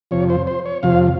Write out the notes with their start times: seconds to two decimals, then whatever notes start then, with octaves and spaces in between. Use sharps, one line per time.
0.11 F2 C3 F3 C#5
0.30 C5
0.47 C5
0.66 C#5
0.83 F2 C3 F3 F5